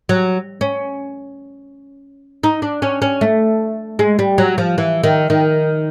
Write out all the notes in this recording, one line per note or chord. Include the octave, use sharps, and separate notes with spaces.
F#3
C#4
D#4
D4
C#4
C#4
A3
G#3
G3
F#3
F3
E3
D#3
D#3